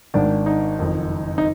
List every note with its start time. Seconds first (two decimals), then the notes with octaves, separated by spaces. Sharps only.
0.14 G#1 G#2 D#3 D4
0.46 D#4
0.79 F#1 F2 D#3
1.38 D#4